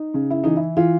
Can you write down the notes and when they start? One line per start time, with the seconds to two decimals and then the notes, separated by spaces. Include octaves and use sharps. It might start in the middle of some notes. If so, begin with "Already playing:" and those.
Already playing: D#4
0.14 C#3
0.30 E4
0.44 E3 D#4
0.57 E4
0.77 E3 F4